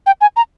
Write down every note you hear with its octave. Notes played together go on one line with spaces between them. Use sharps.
G5
G#5
A#5